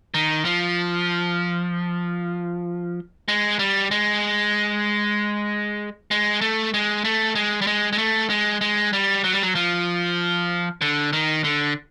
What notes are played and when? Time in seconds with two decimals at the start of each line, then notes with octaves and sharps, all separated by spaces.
0.14 D#3
0.45 F3
3.28 G#3
3.59 G3
3.91 G#3
6.11 G#3
6.41 A3
6.74 G#3
7.04 A3
7.35 G#3
7.61 G3
7.67 G#3
7.92 G#3
7.98 A3
8.30 G#3
8.61 G#3
8.93 G3
9.24 F#3
9.33 G3
9.43 F#3
9.55 F3
10.81 D3
11.13 D#3
11.44 D3